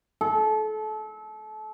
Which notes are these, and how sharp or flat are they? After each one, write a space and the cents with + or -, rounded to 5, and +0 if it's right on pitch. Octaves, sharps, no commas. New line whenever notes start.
A4 -30